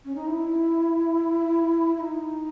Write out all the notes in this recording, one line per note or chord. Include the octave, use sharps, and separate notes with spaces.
C#4
D#4
E4
E4
D#4